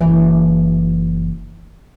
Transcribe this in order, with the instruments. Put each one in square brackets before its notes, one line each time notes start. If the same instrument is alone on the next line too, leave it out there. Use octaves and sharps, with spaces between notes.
[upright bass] F#1 E3